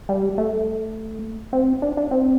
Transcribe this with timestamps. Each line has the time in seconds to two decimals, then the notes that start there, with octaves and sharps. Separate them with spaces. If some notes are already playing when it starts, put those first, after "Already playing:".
0.09 G3
0.38 A3
1.53 C4
1.82 D4
1.97 D4
2.11 C4